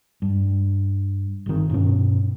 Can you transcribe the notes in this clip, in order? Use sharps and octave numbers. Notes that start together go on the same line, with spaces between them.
G2
G1 D#3
G2 B2 C#4